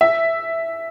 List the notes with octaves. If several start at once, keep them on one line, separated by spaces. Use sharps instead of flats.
E5